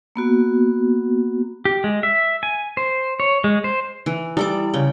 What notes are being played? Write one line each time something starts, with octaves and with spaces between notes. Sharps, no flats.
A#3 B3 F#4
G4
G#3
E5
G#5
C5
C#5
G#3
C5
E3
G3 E4 A4 D6
C#3 G5